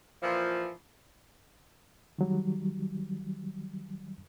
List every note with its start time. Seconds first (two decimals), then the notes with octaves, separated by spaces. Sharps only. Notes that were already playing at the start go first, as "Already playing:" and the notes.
0.23 A#2 E3 F3
2.19 D#3 F#3 G3